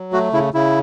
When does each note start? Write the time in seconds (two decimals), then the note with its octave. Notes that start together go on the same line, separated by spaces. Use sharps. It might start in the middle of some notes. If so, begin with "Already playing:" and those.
Already playing: F#3
0.13 A3 F#4
0.33 C#3 E4
0.54 C#3 E4